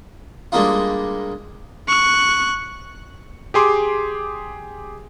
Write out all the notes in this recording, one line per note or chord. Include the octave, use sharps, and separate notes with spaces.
G3 G#3 A#3 D4 D#4 F4
C#6 F#6
G4 G#4 C6 D6